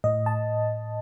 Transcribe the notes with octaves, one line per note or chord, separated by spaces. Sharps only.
A2 D#5
A5